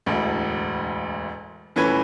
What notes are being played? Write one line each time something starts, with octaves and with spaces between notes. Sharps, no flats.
E1 A1 D2
D#1 E3 A3 C#4 B4 G#6